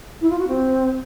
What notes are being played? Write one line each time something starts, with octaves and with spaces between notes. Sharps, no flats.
E4
F4
F#4
C4